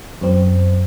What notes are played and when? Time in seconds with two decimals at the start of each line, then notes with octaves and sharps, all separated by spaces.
0.21 F#2 C4